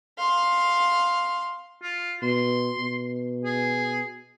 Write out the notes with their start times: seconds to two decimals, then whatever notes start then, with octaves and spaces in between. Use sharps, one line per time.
0.18 F5 C6
1.83 F4
2.22 B2 C6
2.78 B2
3.45 G#4